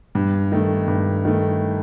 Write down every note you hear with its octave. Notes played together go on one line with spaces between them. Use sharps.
G2
D#3 A3
G2
D#3 A3